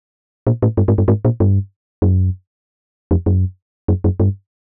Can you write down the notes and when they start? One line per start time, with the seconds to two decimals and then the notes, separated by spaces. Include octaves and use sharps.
0.47 A#2
0.62 A2
0.77 G2
0.88 G#2
0.98 G2
1.08 G#2
1.25 A#2
1.40 G2
2.02 F#2
3.11 F2
3.26 F#2
3.88 F#2
4.04 F#2
4.20 G2